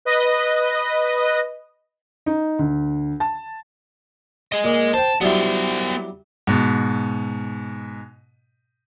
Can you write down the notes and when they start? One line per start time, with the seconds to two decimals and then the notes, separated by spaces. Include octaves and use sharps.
0.05 B4 D#5
2.26 D#4
2.59 D2
3.20 A5
4.52 G#4 D#5
4.64 A#2
4.94 C5 G5 A5
5.21 F#3 G3 B3 E4 C5
6.47 G#2 B2